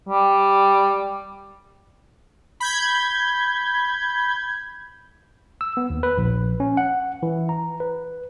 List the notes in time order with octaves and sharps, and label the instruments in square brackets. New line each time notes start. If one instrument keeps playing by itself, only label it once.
[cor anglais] G3
[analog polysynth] B5 G6 G#6
[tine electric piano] E6
B3
D#2
B4
A#1
C#4
F#5
E3
A#5
B4